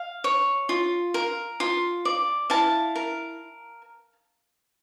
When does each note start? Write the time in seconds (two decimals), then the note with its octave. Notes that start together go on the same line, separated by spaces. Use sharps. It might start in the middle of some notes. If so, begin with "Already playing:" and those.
Already playing: F5
0.24 C#5
0.69 F4
1.14 A#4
1.60 F4
2.05 D5
2.50 E4 F5 A5
2.96 A#4